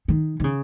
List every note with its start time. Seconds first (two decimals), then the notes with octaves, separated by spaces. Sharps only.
0.08 D#3
0.40 D#3
0.44 C#3